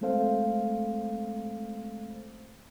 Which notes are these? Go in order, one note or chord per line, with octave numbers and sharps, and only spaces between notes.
G#3 A3 C4 A4 C5 F5